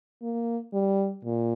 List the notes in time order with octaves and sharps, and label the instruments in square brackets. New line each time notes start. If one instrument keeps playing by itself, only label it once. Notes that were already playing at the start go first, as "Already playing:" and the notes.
[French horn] A#3
G3
A#2